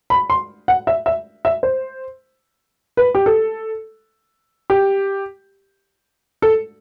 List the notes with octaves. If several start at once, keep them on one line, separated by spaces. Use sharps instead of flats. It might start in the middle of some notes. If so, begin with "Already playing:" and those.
B5
C6
F#5
E5
E5
E5
C5
B4
G4
A4
G4
A4